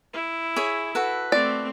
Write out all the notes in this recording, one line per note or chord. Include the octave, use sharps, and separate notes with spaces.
E4
G#4 C#5 E5
F#4 A4 B4
A3 C4 D5